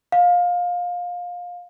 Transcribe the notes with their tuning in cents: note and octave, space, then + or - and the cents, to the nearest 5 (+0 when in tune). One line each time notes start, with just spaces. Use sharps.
F5 +20